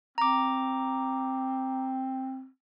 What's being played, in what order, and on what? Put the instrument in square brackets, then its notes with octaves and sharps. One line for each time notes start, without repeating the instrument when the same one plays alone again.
[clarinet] C4 [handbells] A#5 D6